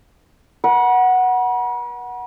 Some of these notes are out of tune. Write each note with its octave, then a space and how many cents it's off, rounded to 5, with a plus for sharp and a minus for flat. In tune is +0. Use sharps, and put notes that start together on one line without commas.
B4 -45 F#5 +0